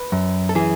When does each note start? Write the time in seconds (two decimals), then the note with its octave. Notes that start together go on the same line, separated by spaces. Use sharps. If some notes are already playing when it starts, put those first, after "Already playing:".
Already playing: B4
0.12 F#2
0.49 A4
0.55 E3 G#4